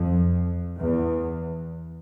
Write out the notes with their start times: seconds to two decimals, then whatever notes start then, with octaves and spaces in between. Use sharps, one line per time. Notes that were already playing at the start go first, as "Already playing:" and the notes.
Already playing: F2
0.78 E2